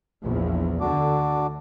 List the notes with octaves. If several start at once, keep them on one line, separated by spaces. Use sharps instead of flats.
A#1 E2
D2 D3 D4 F#4 D6